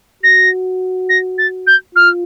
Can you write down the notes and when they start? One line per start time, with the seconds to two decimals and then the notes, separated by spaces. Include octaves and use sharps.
0.23 F#4 A#6
1.09 A#6
1.38 A6
1.67 G6
1.95 F4 F6